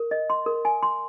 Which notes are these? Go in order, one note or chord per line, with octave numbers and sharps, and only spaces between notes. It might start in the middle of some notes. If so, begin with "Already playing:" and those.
Already playing: A#4
D#5
C6
A#4
G#5
C6